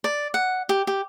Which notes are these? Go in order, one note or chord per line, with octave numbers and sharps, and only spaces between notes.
D5
F#5
G4
G4